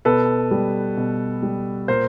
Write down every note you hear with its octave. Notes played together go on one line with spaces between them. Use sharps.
B2 A4 B4
G3
B2
G3
A#2 A#4 C5